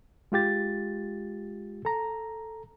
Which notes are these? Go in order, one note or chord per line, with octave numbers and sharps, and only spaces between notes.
G#3 F4 G4 A6
A4 A#5